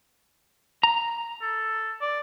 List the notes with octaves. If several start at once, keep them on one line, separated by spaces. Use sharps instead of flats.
A#5
A4
D5